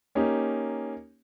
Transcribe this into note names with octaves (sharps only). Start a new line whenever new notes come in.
A#3 C#4 D#4 G4